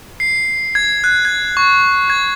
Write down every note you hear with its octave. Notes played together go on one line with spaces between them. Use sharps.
C7
G#6
F#6
G#6
C#6
G#6